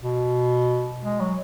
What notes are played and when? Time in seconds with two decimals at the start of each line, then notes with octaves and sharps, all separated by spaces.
0.02 B2
1.04 G#3
1.20 F#3